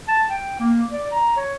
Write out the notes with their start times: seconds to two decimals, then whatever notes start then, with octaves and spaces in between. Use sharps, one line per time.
0.08 A5
0.30 G5
0.60 A#3
0.92 D5
1.12 A#5
1.37 C#5